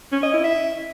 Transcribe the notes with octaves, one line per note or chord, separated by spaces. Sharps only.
C#4
D#5
E4
E5